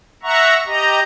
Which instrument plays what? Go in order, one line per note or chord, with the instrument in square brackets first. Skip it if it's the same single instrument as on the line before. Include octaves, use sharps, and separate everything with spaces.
[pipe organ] E5 F#5 A#5 C#6
G4 D#5 A#5